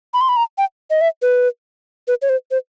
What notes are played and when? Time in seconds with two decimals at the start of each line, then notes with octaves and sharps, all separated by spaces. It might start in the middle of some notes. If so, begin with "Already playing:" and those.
0.14 B5
0.21 C6
0.29 B5
0.37 A#5
0.58 G5
0.90 D#5
1.01 E5
1.22 B4
2.08 B4
2.22 C#5
2.29 C5
2.51 C5